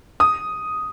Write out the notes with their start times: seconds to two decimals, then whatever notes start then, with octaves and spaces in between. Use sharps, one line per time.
0.20 D#6